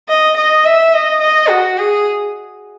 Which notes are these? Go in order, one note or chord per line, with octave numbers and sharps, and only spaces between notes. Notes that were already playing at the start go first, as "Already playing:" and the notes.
D#5
D#5
E5
D#5
D#5
F#4
G#4